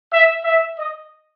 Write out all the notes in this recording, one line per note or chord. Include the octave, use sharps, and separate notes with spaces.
E5
E5
D#5